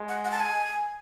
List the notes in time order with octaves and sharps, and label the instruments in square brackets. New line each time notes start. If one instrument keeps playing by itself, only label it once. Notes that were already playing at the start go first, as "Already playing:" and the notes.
Already playing: [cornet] G#3
[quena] F#5
F#5
A5
G#5